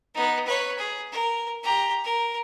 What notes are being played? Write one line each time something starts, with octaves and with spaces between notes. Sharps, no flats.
B3 D#4
B4 C#5
G#4
A#4
G4 A#5
A#4